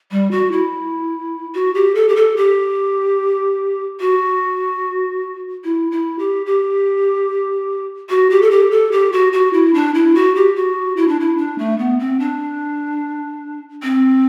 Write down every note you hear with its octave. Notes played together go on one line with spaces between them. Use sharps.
G3
F#4
E4
F#4
G4
A4
G4
A4
G4
F#4
E4
E4
G4
G4
F#4
G4
A4
G4
A4
G4
F#4
F#4
E4
D4
E4
F#4
G4
F#4
E4
D4
E4
D4
A3
B3
C4
D4
C4